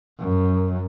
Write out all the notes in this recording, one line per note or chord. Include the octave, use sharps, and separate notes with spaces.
F#2